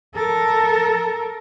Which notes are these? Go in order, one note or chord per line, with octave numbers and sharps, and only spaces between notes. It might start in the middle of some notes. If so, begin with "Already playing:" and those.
A4 A#4